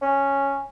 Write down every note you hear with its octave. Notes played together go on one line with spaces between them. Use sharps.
C#4